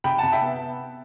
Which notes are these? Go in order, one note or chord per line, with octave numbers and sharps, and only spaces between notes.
C3 G5 B5
F#5 A5
C3
E5 G5
B3